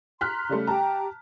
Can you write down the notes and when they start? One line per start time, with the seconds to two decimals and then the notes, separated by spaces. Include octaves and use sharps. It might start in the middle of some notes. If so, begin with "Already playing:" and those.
0.21 A#5 C6 F6 F#6 B6
0.49 C#3 G3 A3
0.67 G4 G5 A5 A#5